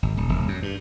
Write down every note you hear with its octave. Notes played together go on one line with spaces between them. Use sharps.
G#1
D#1
D#1
F#2
G2